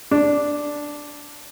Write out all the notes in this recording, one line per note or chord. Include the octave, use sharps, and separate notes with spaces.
D4